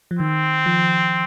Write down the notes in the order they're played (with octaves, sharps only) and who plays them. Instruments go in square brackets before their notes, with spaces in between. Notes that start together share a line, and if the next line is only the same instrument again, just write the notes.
[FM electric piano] F3
[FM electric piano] D#3 [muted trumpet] C4
[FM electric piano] F3